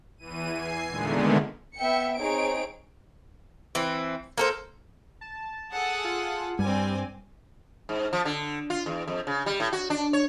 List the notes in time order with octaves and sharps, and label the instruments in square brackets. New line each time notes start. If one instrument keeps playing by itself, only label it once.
[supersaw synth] E2 E3 D#7
G#5 C7
A#2 D3 D#3 G#3 A3 B3
[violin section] B3 E5 G5 C#7
C4 D#4 G#4 C#5 D7
[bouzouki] E3 C4
A#3 A4 C5
[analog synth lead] A5
[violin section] G#4 A4 F#5
[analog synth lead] F4
[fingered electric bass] G2 [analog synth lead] G3 [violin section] C4 D5 G#5
[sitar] G#2
F3
D3
F4
E2
F2
C#3
G3
A2
F#4
D4
C#5